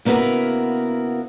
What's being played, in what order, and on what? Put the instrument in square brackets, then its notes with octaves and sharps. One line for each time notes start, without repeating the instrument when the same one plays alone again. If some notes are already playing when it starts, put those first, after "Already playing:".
[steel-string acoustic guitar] C#3 A#3 B3 E4 F#4 A#4